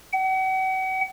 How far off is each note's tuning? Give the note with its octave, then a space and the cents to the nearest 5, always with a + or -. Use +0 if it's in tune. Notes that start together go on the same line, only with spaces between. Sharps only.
F#5 +40